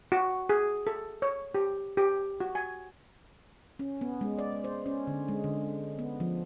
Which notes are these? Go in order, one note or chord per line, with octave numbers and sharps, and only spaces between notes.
F#4
G#4
A4
C#5
G4
G4
F#4
G#5
C#4
B3
G#3
D5
C5
C#4
D3
G#3
D3
B3
F3